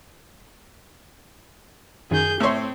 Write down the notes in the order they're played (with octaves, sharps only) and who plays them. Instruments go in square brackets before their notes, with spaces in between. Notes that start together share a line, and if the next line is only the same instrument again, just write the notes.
[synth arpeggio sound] F#2 D#3 [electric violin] G#4 G6
[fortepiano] A2 C#5 [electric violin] C4 [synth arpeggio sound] E5 C6